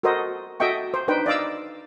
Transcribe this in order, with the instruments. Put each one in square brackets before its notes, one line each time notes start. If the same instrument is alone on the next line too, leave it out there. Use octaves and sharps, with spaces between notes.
[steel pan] F#4 A4 A#4 C5 D#5
F#4 A4 D#5 E5 G5 C#6
C5
D4 D#4 B4 C5 G5
D5 D#5 F5 D6 E6